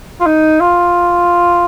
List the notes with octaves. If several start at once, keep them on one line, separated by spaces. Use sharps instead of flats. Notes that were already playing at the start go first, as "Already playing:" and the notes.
F4
D#4
F4